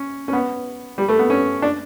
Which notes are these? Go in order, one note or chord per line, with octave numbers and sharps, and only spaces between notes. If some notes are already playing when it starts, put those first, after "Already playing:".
Already playing: C#4
C#4
B3
G3
A3
B3
C#4
D4